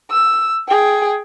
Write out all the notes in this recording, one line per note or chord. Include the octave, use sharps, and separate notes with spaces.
E6
G#4 G5